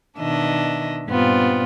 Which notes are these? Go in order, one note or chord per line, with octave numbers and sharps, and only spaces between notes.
B2 D#3 D4 D#5 E5
G2 A#2 B3 C4 F4